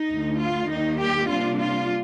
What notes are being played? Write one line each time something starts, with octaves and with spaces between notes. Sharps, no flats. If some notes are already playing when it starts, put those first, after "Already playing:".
Already playing: D#4
D2 D3 A3
F4
D#2 D#3 G3 A#3 D#4
G4
C3 G3 A#3 D4 F4
F4